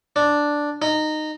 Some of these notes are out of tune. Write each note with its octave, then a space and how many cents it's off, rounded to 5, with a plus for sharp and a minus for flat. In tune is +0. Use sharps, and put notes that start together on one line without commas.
D4 +0
D#4 -15